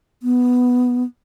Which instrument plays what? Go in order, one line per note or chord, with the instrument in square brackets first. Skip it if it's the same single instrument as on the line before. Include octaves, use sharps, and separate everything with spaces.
[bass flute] B3